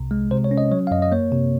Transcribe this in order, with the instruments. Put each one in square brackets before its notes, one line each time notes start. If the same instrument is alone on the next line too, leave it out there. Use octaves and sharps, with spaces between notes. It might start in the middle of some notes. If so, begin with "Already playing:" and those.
Already playing: [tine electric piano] C2 C3
G#3
C3 C5
C#5
C#4
D#5
F#3 C#5
F5
F#2 D#5
D#5
A#3 C#5
C3